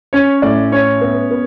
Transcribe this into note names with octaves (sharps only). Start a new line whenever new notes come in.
C#4 C#5
A2 D5
C#4 C#5
B3
B3